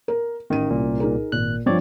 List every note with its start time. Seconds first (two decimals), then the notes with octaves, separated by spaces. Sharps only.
0.08 A#4
0.50 A1 D#3 D#7
0.70 C2 A#2
1.00 D#4 G#4 A#4
1.32 G#1 A#2 F#6
1.66 G2 F3 C4 C#5 D5